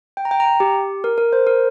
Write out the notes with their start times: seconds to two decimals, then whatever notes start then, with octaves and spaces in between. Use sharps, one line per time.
0.17 G5
0.25 A#5
0.31 G5
0.40 A#5
0.45 G5
0.60 G4
1.04 A#4
1.18 A#4
1.33 C5
1.47 A#4